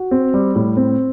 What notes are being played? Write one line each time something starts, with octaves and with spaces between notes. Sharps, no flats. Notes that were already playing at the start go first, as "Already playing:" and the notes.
Already playing: F#4
C4
G3
A2
C4